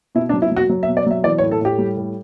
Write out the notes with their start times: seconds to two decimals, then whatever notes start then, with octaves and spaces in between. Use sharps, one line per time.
0.15 B2 E4
0.29 D4
0.34 F#3
0.42 E4
0.52 F#3 F#4
0.69 F#3
0.83 E5
0.88 B2
0.97 D5
1.06 F#3 E5
1.24 E3 D5
1.38 C#5
1.42 A2
1.51 A4
1.61 A2 G4
1.78 G3
1.97 A2